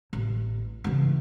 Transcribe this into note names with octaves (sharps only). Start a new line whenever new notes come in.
A1
C#3 E3